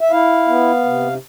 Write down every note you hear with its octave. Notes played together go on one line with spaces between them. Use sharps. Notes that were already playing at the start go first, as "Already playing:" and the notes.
E5
E4 F5
B3
C3